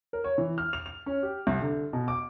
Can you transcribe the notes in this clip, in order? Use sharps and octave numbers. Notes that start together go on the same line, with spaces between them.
A#4
C#5
E3
F6
F7
F7
C#4
G4
C2
D3
B2
D6